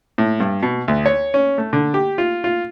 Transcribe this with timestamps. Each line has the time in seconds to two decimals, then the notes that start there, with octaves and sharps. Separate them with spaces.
0.18 A2
0.40 G2
0.63 B2
0.88 D2
1.06 C#5
1.34 C#4
1.58 A3
1.73 D3
1.94 G4
2.18 F4
2.44 F4